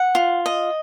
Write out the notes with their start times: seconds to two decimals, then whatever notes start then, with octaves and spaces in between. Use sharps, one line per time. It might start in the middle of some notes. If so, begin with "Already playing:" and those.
Already playing: F#5
0.15 F4
0.46 D#5